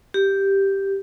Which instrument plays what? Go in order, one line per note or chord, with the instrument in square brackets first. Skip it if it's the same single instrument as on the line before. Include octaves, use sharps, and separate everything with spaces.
[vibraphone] G4